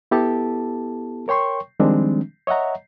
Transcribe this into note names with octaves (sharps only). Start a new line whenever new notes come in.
B3 E4 G4 A4 A5
A#4 C#5 G5 C6 C#6
D#3 F3 G3 G#3 C4 D4
C#5 D#5 E5 F#5 A#5